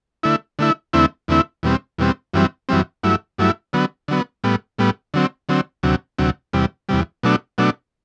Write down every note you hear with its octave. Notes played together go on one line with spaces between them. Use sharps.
D3 A3 E4
D3 A3 E4
E2 D3 A3 C4 E4
E2 D3 A3 C4 E4
E2 B2 G3 C4
E2 B2 G3 C4
F#2 E3 G3 C4
F#2 E3 G3 C4
G2 F#3 A3 E4
G2 F#3 A3 E4
D3 F#3 B3
D3 F#3 B3
A2 G3 B3
A2 G3 B3
D3 F#3 C4
D3 F#3 C4
D2 C3 F#3
D2 C3 F#3
E2 C3 G3
E2 C3 G3
B2 F#3 A3 D4
B2 F#3 A3 D4